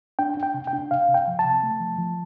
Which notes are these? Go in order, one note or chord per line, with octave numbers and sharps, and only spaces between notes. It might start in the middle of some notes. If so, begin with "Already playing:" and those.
D4 G5
D4
G5
C3
G5
D4
C3 F5
C3
G5
F3
A5
C3
A3
F3
F3